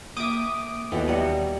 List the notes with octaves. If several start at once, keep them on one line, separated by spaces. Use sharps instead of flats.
A#3 E5 G5 D6 D#6 D7
D#2 B2 E3 B3 A4 G5
F#3 G3 D#4 D#5 F#5